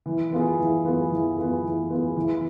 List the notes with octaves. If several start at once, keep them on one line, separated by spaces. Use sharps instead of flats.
E3
B3 F4 G#4
E3
B3 F4 G#4
E3
B3 F4 G#4
E3
B3 F4 G#4
E3